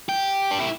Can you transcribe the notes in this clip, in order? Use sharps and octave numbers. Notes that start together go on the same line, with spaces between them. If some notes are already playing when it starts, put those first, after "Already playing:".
G4
D4
E4